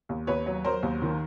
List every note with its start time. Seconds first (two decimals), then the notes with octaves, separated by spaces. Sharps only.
0.09 D#2
0.27 D#2 B4 C#5
0.46 F#3
0.64 F#3 A#4 C5
0.83 D#2
1.02 D#3